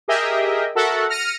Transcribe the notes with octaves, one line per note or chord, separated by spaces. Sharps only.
G4 G#4 A#4 D#5 E5 G5
F#4 A4 A#4 E5 F#5
F6 A#6 C#7 D#7